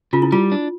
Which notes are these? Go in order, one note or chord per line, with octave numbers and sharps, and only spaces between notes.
C#3 F4
E4
G3 F4
D4